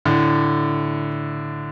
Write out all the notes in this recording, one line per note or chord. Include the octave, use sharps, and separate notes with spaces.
A2 D3